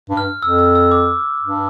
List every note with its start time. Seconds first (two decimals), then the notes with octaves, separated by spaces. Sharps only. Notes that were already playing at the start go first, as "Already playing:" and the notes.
0.09 G2
0.17 F6
0.42 F2 E6
0.59 E6
0.75 E6
0.91 D6
1.41 G2